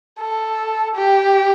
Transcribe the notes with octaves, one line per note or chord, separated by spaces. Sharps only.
A4
G4